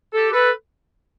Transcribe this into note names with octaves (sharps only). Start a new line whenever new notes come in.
G4 A4
A4 B4